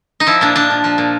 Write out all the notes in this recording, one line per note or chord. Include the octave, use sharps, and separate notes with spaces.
D#4
F3 E4
A#2 D4
F3 D4
A#2
F3
A#2